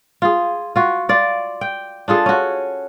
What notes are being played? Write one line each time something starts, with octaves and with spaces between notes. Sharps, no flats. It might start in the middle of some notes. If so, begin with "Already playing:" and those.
F4 G#4
F4 F#4
F4 D5
G5
D4 F4 G#4 A4
C#4 F#4